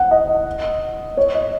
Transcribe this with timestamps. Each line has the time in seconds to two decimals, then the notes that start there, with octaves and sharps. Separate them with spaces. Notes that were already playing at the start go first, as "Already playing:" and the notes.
Already playing: F#5
0.11 D#5
1.17 C#5
1.35 D#5